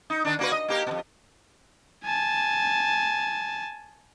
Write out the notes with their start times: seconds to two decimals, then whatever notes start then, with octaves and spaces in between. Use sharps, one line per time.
0.10 D#4
0.25 D#3 D4
0.39 A#3 F#4 B4
0.52 D#5
0.68 A#3 G4 A#4
0.87 F2 B2
2.05 G#5 A5